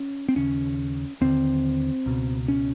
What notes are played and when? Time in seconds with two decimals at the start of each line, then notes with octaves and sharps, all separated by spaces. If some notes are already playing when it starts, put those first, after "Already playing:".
Already playing: C#4
0.29 C4
0.36 D#2 C#3 C#4
1.21 D#2 D3 C4
2.06 C#2 B2
2.48 C#4